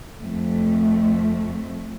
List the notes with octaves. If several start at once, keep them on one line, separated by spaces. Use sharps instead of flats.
F2 A3